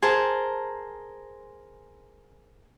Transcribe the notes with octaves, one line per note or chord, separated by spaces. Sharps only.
G#4 A#4 C5 A5